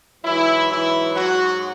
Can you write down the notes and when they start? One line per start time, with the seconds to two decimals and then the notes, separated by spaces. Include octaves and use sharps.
0.24 G#2 E3 F#3 E4
0.71 E3 E4
1.15 F#3 F#4